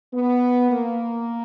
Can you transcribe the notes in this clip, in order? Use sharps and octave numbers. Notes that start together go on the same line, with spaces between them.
B3
A#3